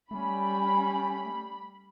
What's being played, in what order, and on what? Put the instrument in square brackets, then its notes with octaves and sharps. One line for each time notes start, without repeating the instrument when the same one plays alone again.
[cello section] G3 [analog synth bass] A3 [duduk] C#4 [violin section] B5